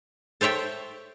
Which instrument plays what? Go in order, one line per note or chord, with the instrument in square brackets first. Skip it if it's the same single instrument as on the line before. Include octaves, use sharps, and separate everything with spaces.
[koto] A4 C5 C#5 E5 G5